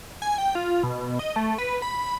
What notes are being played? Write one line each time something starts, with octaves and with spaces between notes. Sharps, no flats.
G#5
G5
F4
B2
D#5
A3
B4
B5